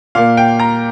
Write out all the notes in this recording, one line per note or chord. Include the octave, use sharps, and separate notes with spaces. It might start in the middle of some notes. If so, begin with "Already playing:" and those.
A#2 A#3 F5
G5
A#5